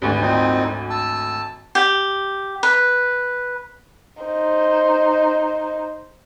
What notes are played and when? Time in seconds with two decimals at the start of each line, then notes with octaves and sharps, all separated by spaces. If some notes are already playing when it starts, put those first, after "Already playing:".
0.02 G#1 D2 B4
0.20 A#2 C4 D#4
0.90 A5 E6
1.75 G4
2.63 B4
4.23 D#4 C5